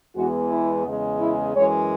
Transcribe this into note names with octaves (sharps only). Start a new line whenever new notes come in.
E2 E3 G#3 B3 F#4
E4
E2 C#3 G#3
E4
F#2 E3 G#3 C#5